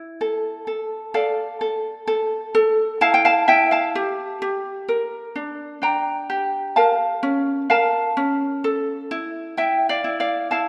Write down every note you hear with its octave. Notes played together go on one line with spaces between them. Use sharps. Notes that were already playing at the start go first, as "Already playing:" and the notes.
Already playing: E4
A4
A4
A4 D5 F5
A4
A4
A4
E4 F5 A5
G5
F5 A5
E4 E5 G5
F5 A5
G4
G4
A#4
D4
D4 G5 A#5
G4
A#4 F5 A5
C#4
A#4 F5 A5
C#4
A4
E4
E4 E5 G5
D5 F5
E4
D5 F5
E4 F5 A5